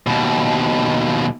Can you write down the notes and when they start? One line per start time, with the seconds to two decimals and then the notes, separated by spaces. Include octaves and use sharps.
0.07 D#2 B2